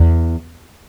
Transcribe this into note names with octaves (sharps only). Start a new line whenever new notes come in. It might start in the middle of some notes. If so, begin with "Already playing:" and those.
Already playing: E2